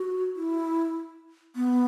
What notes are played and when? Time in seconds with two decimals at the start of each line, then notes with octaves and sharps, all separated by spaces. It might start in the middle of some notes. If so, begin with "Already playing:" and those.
Already playing: F#4
0.36 E4
1.56 B3